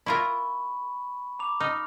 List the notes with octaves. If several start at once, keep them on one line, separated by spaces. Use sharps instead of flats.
E4 F4 A#4 B5 C#6
A#5 D6 F7
D#4 F6